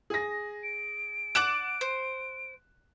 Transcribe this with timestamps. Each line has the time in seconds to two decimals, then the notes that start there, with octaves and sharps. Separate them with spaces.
0.10 G#4 A#6
0.63 D7
1.35 D5 F#5 D6 F#6 E7
1.81 C5